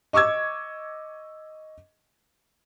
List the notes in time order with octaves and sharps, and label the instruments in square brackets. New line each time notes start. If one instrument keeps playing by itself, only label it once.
[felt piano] D#5 C#6 D6 E6 G#6